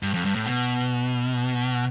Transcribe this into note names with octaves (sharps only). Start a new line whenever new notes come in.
G2
F2
G2
A2
B2